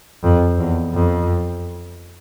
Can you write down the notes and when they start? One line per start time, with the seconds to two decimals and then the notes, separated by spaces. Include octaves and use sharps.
0.24 F2
0.59 E2
0.94 F2